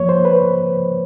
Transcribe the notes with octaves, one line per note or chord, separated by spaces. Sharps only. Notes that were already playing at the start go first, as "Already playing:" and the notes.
Already playing: G#2 F3 A#3 C#5
C5
B4